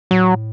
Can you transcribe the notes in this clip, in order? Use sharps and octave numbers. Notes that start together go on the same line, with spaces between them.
A2 F#3